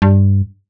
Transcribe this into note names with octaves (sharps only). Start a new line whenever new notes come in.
G2